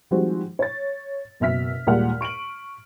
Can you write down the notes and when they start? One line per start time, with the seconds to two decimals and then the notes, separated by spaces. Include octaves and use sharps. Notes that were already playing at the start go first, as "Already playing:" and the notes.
0.11 D#3 F3 G3 G#3 C4 F#4
0.59 C#5 A6
1.40 F#1 B2 E5 F6 B6
1.87 D#2 A#2 G3 G#3 F#5 F6
2.21 C#6 D7 D#7 F#7